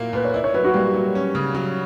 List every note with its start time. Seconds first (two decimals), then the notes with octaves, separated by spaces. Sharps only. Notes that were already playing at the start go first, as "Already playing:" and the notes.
Already playing: A#2 F#3 A#3 E4
0.13 A#2 B4
0.25 C#5
0.34 E4 D5
0.44 C#5
0.54 F#3 B4
0.65 F#4
0.74 G3 A#3
0.94 F#3
1.15 C#4
1.35 C#3
1.55 F#3